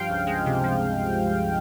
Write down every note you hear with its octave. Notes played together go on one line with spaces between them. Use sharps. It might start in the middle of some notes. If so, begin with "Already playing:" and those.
Already playing: G2 F3 F5 G5
C#2
G#3
C3
F3